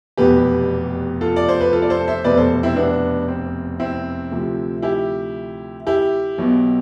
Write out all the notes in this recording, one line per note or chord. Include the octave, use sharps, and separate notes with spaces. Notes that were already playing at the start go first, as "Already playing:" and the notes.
F1 E2 B2 G4 B4
F4 A4
D5
C5
B4
F4 A4
D5
A4 C5
C5 E5
F1 E2 B2 B4 D5
A4 C5
C4 E4
B3 D4
C4
C4 E4
D2 C3 F3
E4 G4
E4 G4
B1 B2